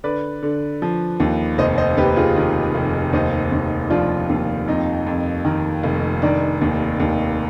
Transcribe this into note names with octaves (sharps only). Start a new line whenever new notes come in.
D3 B4 D5
D3
F3
D#2
F1 C5 D#5
C5 D#5
D#2 G4 B4
F4 G#4
D#3
F1
D#2 C5 D#5
D#2
F3 D4 F4
D#2
F2 D#4
F2
D#3
F1
D#3 D4
D#2
D#2